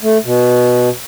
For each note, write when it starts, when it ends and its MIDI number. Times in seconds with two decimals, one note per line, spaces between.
0.02 0.18 57
0.25 0.89 47